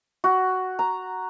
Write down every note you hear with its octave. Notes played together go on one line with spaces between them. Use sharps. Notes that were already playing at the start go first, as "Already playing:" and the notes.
F#4
A#5